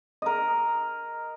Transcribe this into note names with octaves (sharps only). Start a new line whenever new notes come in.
A#4 D#5